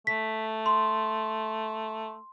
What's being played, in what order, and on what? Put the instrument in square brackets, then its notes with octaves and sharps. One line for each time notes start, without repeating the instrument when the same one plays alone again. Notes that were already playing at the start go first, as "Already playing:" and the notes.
[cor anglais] A3 [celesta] B6
[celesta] C6